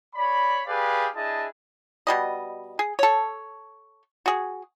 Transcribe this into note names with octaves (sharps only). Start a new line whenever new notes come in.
C#5 D5 B5
G4 G#4 B4 D5 F5
D4 E4 G#4 D#5 A5
B2 G3 D#5
G#4
A4 C#5
F#4 G#4